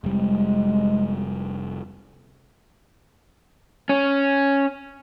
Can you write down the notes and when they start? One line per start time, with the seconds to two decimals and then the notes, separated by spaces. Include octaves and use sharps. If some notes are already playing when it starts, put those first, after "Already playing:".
0.04 F1 G3 G#3
3.89 C#4